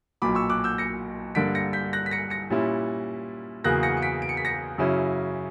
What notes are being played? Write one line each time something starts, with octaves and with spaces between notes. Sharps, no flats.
B1 A#2 F#3 B5 D6
C#6 E6
D6 F#6
E6 G6
A#6 C#7
G2 D3 A#3 D4 B6 D7
A#6 C#7
G6 B6
F#6 A#6
B6
A#6 C#7
A#6 C#7
A#2 G3 C#4 E4
E2 C#3 F#3 A#3 F#6 A#6
A#6 C#7
C#7
B6 D7
D7
C#7
B6
A#6 C#7
F#2 C#3 F#3 C#4 E4